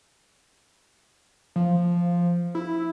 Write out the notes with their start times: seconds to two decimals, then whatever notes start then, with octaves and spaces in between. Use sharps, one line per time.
1.56 F3
2.55 E4